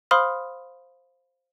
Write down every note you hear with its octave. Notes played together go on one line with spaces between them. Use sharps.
C5 F5 B5 C6 D#6 F6